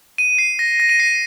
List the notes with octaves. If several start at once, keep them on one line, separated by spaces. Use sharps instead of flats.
D#7
C7
A#6
A#6
D#7
C7